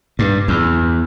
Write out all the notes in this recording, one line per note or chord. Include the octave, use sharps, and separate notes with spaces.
G2
E2